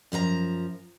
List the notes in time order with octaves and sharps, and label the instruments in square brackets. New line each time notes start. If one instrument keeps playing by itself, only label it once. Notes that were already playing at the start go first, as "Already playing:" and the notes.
[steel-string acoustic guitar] F#2 F3 A4 A#5